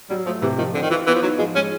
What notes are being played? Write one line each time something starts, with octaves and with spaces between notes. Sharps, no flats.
F#3 G3
F3 A3
C3 E3
D#3 F3
D3 C4
D#3
E3 F4
E3 B3
F3
F#3 D#4
F3 G#3
G#3 C#4